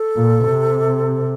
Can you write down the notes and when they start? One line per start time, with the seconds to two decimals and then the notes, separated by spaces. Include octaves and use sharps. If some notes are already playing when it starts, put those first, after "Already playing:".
Already playing: A4
0.16 A#2
0.45 C3